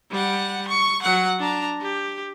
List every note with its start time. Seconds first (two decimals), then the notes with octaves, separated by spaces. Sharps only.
0.11 G3 F#5
0.68 C#6
1.03 F#3 F#5
1.39 D4 A#5
1.81 G4